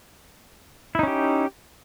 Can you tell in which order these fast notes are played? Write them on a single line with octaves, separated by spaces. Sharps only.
E4 D#4 C#4 G4